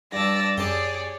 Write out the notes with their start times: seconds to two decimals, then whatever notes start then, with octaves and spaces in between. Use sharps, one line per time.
0.13 G2 D5 A5 E6 A#6
0.58 F#2 G4 G#4 C#5 D5 A5